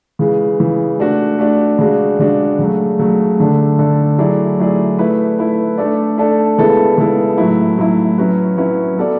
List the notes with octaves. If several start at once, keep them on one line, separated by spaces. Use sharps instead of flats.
C#3 E3 G#3
C#3 E3 G#3
A3 D4 F#4
A3 D4 F#4
C#3 G#3 D4 F#4
C#3 G#3 D4 F#4
C#3 F#3 A3
C#3 F#3 A3
D3 A3 D4 A4
D3 A3 D4 A4
F#3 A3 E4 G#4 D5
F#3 A3 E4 G#4 D5
A3 E4 B4
A3 E4 B4
A3 D4 A4 D5
A3 D4 A4 D5
C#3 G#3 B3 E4 A4
C#3 G#3 B3 E4 A4
A2 F#3 A3 E4
A2 F#3 A3 E4
F#3 C#4 E4 B4
F#3 C#4 E4 B4
B3 F#4 A4 D5